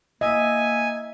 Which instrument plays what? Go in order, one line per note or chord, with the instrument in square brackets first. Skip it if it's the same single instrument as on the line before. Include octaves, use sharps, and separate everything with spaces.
[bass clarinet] A#3 [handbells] D#5 [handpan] E5 [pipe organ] G#5